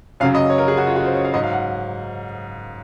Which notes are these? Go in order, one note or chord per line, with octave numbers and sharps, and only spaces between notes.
F#2 C#3 F#3 F5
D#5
C#5
A#4
G#4
F#4
F4
F#4
C5
C#5
F5
G#2 F#3 D#5
F5
F#5